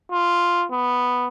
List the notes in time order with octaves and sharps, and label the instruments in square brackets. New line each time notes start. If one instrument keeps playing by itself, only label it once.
[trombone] F4
B3